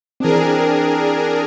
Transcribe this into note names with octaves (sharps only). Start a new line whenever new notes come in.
E3 C4 D4 G#4 A#4